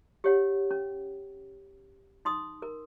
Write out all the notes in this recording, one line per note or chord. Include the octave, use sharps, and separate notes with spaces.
G4 C#5 F#5
C#4
D#4 C6 D#6
A#4